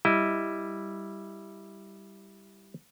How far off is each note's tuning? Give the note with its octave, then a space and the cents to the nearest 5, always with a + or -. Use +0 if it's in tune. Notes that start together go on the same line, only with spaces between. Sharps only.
G3 +0 E4 +0 D#5 +0